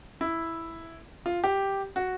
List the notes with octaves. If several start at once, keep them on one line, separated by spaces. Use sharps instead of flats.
E4
F4
G4
F#4